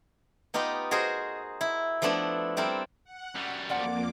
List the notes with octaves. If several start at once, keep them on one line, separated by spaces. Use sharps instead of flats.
B3 D#4 F4 G4 D#5
F#4 G#4 A#4 C5 D#5
E4
F3 A3 B3 D4 E4
G3 C4 E4 A4 A#4
F#5
F#2 G3
F2 F3 A#3 D5 F#5 D6